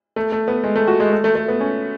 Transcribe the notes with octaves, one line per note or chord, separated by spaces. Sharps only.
A3
A3
B3
G#3
A3
F#4
G#3
A3
A3
A3
B3
C#4